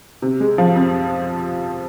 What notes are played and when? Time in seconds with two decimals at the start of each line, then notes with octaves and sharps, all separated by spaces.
0.22 C3
0.40 G#3
0.58 F3
0.75 F2